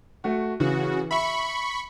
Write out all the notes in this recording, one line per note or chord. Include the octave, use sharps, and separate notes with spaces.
A3 F#4
C#3 E3 F#4
E5 B5 C#6